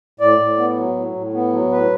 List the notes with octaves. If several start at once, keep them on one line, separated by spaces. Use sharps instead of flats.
A2 D5
A2
B3
F#3
A2
A2
B3
F#3
A2 B4